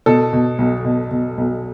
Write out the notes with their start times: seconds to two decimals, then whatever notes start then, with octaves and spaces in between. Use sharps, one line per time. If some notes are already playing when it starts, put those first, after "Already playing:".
0.06 B2 A4
0.33 B2
0.58 B1
0.85 B2
1.11 B2
1.38 B1